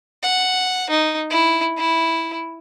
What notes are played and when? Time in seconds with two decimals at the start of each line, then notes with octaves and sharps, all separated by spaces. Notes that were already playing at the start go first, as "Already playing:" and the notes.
0.23 F#5
0.90 D#4
1.30 E4
1.78 E4